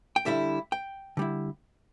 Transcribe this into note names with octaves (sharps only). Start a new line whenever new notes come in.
G5
D3 G3 E4 E5
G5
D3 G3 E4